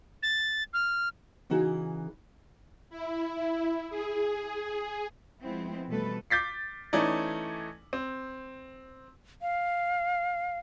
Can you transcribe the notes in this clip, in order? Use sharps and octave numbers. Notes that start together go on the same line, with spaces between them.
A6
F6
C#3 E3 D#4 F#4 G#4
E4
G#4
F3 G#3 B3 C4 E4
B2 E3 G3 A3 A4 B4
D6 G6 A6 B6 C7
E3 A3 C#4 D#4 D5
C4
F5